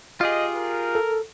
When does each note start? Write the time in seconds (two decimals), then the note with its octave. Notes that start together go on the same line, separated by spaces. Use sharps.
0.21 F4 G4 G#4 D#5
0.56 A#4
0.95 A4